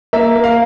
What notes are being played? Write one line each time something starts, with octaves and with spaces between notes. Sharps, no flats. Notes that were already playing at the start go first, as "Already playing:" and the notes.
A#3 E5
A#3
F5